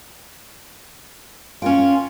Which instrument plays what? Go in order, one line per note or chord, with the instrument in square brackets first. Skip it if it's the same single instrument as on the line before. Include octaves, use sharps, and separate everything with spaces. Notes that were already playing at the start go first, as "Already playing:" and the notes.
[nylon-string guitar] C#4 A#4 G5 [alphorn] F4